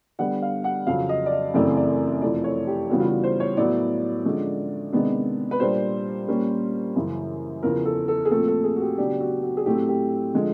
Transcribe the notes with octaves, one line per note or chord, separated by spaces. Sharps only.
D3 G3 B3 D4 F#5
F5
F#5
F2 C#3 F#3 F5
D#5
D5
D#5
F#2 C#3 E3 A3 C4 D5
D5
F2 C3 E3 A3 D5
C#5
G4
C#3 E3 G3 B3 D4 F#4
F4
F#4
C5
C#5
A2 F#3 B3 D5
D3 F3 G#3 C#4
C3 D#3 G#3 B3 D4
B4
A#2 G3 A#3 D4 C5
A#2 G3 A#3 C#4
F#2 C#3 E3
E2 C#3 F3 A#4
A4
A4
G#4
A#2 F3 A3 C4 A4
A4
G#4
F#4
G4
C#3 F#3 B3 D4 G4
F#4
F#4
G#4
A2 F#3 A3 C4 G4
G4
D3 F3 G#3